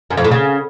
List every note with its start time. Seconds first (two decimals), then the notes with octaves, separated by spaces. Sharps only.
0.10 F#2
0.17 F2
0.24 A2
0.31 C#3